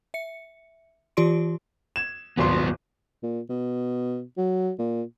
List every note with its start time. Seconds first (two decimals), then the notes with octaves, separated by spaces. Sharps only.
0.14 E5 C#7
1.17 E3 F4 G4 D5 C6 D7
1.96 G#6 E7
2.37 D#1 G#1 F#3 B3 C6
3.23 A#2
3.50 B2
4.38 F#3
4.79 A#2